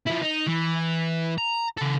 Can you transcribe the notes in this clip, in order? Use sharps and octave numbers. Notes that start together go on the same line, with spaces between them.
F3 E4
D#4
E3
A#5
C#3 A4